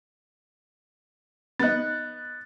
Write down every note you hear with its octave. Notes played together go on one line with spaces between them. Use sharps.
B3 D#4 F#6 A6